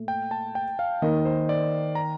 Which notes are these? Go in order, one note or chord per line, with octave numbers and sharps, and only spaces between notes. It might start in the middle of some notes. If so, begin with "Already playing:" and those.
Already playing: A#2 A3
G5
A5
G5
F5
D#3 A#3 D#4 D#5
C5
D5
A#5